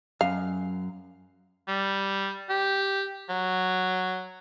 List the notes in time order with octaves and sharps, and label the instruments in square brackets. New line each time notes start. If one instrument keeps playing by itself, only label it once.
[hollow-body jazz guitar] F#2 [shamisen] F5
[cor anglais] G3
G4
F#3